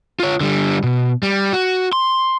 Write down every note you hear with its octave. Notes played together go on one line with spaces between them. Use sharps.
F4 C#5
D3 G3
B2
G3
F#4
C6